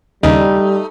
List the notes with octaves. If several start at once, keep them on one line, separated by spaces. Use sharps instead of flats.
D#2 C#3 G3 A3 D#4